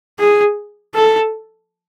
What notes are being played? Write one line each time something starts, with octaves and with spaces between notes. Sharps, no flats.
G#4
A4